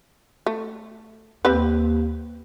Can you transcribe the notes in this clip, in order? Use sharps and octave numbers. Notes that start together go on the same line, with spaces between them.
A3
D#2 C4 G4 B4